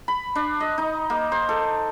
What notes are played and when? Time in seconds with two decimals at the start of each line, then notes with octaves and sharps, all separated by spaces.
0.08 B5
0.35 D4
0.60 D#5
0.78 D#4
1.10 A#3
1.32 C5
1.49 A4